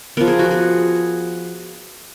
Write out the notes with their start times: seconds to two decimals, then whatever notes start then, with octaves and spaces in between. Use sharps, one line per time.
0.17 F3 B3 A#4
0.28 G#4
0.39 F#4
0.51 G#4